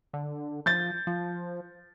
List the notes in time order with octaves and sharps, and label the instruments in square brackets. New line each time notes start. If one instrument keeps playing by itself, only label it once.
[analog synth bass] D3
[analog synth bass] F3 [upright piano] G6 A6
[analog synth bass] F3